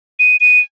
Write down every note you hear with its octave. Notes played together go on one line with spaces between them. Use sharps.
D#7
D#7